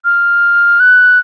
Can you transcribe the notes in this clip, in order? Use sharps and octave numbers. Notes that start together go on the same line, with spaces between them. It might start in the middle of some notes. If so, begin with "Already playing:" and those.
F6
F#6